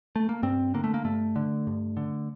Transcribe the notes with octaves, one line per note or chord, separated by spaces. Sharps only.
A3
A#3
G2 C4
D3 A#3
A3
A#3
G2 A3
D3
G2
D3